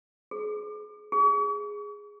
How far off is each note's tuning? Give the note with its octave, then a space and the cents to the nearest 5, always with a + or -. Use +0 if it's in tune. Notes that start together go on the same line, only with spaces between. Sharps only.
G#4 +30
G#4 -5